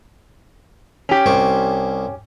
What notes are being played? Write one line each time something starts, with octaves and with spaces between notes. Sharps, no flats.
C#4 G4
C2 C5 C#6